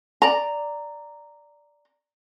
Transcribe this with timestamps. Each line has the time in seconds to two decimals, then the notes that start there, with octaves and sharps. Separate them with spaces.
0.22 D5 A#5